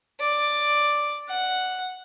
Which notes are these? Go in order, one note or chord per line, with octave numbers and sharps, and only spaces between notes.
D5
F#5